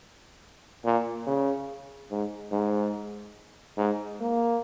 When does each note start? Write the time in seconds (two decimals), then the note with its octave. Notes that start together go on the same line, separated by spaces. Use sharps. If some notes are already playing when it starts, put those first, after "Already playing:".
0.85 A#2
1.27 C#3
2.11 G#2
2.52 G#2
3.77 G#2
4.21 A#3